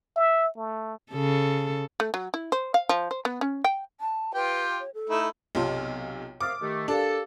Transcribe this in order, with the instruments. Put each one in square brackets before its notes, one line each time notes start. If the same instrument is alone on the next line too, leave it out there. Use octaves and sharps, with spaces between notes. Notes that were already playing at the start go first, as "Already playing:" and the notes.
[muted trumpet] E5
A3
[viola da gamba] C#3 A4
[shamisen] A3
F#3
E4
C5
F5
F3
C5
B3
C#4
G5
[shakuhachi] A5
[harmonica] F4 G4 G5 [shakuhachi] B4
[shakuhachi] C#5
A4
[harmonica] A3 D#4 E4
[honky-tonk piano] B1 C3 F4 [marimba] C#5 A5 C6
[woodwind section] C3 A#4 F5 [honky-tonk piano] D6 [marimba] D#6 F6 A6
[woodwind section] D#3 A3 [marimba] G4
[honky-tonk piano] D4 [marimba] G4 A#4 F5 [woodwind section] A4